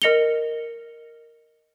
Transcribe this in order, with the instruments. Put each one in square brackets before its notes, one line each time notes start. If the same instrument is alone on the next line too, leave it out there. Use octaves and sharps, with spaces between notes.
[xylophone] A#4 D#5 A#6 C#7 F7 G7